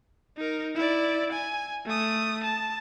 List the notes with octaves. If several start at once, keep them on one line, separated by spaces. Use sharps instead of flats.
D#4 A#4
E4 D5
G#5
A3 D#6
A5